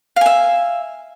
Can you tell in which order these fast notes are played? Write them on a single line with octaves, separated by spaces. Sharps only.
F5 G#5 E5